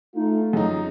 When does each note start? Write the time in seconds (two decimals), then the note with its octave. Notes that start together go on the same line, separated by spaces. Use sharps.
0.15 A3 D#4 F4
0.53 F#2 D#4 G#4